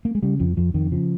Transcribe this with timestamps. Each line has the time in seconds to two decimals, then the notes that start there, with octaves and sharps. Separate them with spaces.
0.05 A#3
0.15 G#3
0.23 C#3 G3
0.40 F2 F3
0.57 F2 F3
0.74 F2 D#3
0.92 C#3 F3